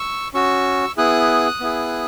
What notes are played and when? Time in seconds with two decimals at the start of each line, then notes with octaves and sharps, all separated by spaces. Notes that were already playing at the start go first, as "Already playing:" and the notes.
Already playing: C#6 E6
0.34 C#4 F#4 C#6 E6
0.97 B3 E4 G#4 D#6 F#6
1.61 B3 E4 G#4